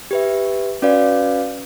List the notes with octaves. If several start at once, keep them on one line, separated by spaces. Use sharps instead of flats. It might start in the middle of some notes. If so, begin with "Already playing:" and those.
G4 B4 E5
C#4 F#4 B4 D5 F5